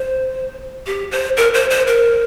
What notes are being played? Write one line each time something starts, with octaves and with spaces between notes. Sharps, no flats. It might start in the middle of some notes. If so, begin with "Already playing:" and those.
Already playing: C5
G4
C5
A#4
C5
C5
A#4